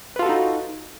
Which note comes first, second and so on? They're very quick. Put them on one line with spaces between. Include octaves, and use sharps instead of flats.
B4 F4 A4 F#4 D#4